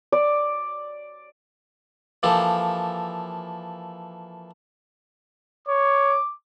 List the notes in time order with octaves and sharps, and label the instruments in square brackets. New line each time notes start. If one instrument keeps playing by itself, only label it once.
[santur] D5
[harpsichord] E3 F3 A#3 G4 A4
[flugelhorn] C#5 [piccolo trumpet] D6